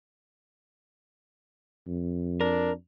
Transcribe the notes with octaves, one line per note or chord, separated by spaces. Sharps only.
F2
D4 A#4